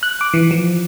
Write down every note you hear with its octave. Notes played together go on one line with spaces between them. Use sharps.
F#6
D6
E3
F3